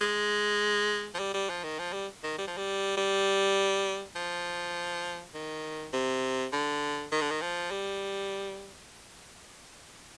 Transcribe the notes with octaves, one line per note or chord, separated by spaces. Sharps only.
G#3
F3
G3
G3
F3
D#3
F3
G3
D#3
G3
F3
G3
G3
F3
D#3
C3
D3
D#3
D3
D#3
F3
G3